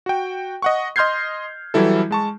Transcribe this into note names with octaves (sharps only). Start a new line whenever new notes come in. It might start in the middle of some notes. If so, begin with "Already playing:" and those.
F#4 G5
D#5 F#5 C#6
D#5 C6 F6 G6 G#6 C7
E3 F#3 G3 E4 A4
G#3 A5 C#6